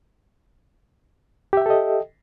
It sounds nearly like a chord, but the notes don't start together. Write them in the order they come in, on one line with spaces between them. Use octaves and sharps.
G4 E5 G5 A4 D#5